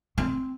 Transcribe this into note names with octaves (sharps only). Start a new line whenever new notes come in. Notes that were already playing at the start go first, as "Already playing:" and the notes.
C4